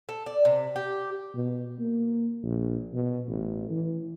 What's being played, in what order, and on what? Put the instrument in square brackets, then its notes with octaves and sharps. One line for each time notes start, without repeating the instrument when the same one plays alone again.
[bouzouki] A4
D5
C3
G4
[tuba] B2
A#3
A#1
B2
A1
E3